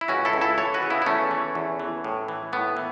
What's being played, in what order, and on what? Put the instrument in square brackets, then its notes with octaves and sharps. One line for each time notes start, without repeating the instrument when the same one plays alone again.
[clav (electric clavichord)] E4
C#2 C#4 F#4
E4 A4
C#2
E4 A4
E3 A4 C#5
F#4 B4
C#3
B3 E4
E4
E2 A3 C#4
E3
E2
E3
A2
E3
A2 B3
E3